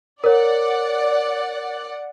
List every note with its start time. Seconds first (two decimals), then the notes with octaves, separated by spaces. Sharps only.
0.24 A#4 C#5 D5 F#5